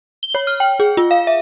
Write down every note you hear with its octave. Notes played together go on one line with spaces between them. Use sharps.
G7
C#5
F6
G5
G#4
F4
F5
E5